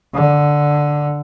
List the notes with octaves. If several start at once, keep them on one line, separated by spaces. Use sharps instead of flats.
D3